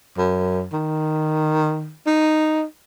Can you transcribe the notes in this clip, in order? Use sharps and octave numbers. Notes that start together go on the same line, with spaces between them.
F#2
D#3
D#4